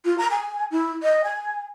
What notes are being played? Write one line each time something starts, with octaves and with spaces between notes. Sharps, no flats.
F4
A#5
G#5
E4
D#5
G#5